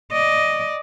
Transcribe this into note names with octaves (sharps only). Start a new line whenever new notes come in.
D5 D#5